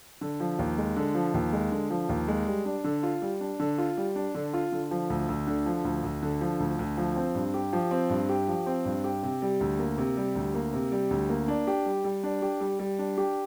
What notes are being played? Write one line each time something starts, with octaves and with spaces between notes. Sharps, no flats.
D3
F3
D#2
G#3
D3
F3
D#2
G#3
D3
F3
D#2
G#3
G3
D4
D3
F4
G3
D4
D3
F4
G3
D4
D3
F4
D3
F3
D2
D2
D3
F3
D2
D2
D3
F3
D2
D2
F3
C4
G2
G4
F3
C4
G2
G4
F3
C4
G2
G4
C3
G3
D2
A#3
C3
G3
D2
A#3
C3
G3
D2
A#3
D4
G4
G3
G3
D4
G4
G3
G3
D4
G4